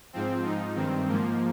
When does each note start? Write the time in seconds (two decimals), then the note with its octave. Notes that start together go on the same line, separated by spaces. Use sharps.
0.13 G#2 F3 C4
0.45 G#2 F3 D#4
0.75 G2 D#3 C4
1.07 G#2 F3 A#3